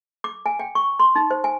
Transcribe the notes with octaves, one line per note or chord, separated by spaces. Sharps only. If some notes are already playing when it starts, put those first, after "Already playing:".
D6
G#5
G5
C#6
C6
D#4
C5
G#5